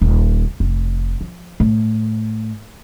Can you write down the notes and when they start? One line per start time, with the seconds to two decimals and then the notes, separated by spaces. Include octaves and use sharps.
0.01 D#1
0.60 F1
1.21 F3
1.60 A2